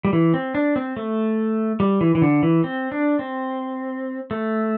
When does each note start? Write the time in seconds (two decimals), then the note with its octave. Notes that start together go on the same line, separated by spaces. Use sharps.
0.05 G3
0.13 E3
0.34 C4
0.55 D4
0.76 C4
0.97 A3
1.80 G3
2.01 E3
2.15 E3
2.22 D3
2.43 E3
2.64 C4
2.92 D4
3.19 C4
4.31 A3